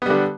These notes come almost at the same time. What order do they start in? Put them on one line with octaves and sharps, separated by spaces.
B3 G3 D3